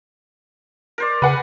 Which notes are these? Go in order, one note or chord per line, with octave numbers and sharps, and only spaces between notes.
A#4 C5 D5
C#3 B4 F#5 G#5